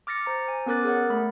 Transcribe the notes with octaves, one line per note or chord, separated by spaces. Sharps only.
D6 F6 A6 A#6 C#7
C5 A#5
G#5
B3 C#4 A#4 D6 F#6 A6
G#4 A#4 C#5 F#5
A3 B5